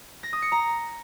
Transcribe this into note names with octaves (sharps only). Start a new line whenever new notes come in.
A#6
D#6
C#7
A#5